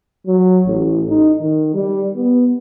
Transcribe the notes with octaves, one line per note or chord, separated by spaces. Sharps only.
F#3
A1
D#4
D#3
G3
B3